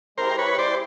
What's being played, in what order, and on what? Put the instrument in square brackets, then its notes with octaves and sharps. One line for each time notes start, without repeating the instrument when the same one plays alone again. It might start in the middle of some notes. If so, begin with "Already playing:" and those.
[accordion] G#3 C4 E4 G4 [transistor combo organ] A#4 C5
[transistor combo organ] B4 C#5
C5 D5